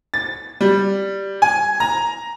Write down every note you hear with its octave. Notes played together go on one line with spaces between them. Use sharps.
A6
G3
G#5
A#5